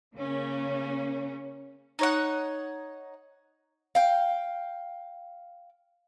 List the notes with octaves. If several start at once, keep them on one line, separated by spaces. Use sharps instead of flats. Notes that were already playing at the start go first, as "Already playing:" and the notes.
C#3 A#3 C#4
D#4 C#5 F#5
F5 G5